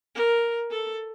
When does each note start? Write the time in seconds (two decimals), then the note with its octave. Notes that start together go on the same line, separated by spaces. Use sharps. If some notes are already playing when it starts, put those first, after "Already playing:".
0.15 A#4
0.71 A4